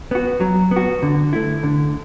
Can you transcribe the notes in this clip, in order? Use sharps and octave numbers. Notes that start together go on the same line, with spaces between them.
B3 F#4
F#3
B3
F#4
D3
A3 E4
D3